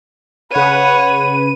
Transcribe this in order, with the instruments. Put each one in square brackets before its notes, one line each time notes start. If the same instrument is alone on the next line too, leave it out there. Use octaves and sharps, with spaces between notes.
[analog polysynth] C#3 B4 D#7 [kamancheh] C#5 F#5 [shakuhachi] B5